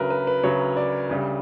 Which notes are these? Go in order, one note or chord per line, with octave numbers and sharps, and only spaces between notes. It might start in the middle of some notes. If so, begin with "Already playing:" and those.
Already playing: D2 C#3 F#3 A#4 B4
B4
B4
D2 C#3 F#3 C#5
D5
D2 C#3 G3